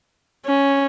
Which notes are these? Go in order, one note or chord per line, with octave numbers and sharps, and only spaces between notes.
C#4